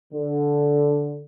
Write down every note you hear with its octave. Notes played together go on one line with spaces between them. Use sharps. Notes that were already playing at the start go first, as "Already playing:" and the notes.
D3